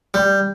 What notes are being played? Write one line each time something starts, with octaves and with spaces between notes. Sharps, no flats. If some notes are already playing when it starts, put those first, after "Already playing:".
G3